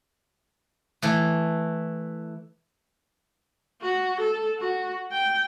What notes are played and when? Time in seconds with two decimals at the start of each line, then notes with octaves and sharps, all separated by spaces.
1.02 E3 A3
3.82 F#4
4.21 A4
4.59 F#4
5.12 G5